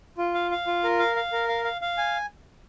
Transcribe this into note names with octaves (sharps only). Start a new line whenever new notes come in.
F4
F5
F5
F4
A#4
F5
F5
A#4
F5
F5
F5
G#5